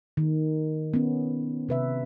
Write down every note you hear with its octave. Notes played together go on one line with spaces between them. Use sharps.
D#3
B3 C#4
C3 B4 E5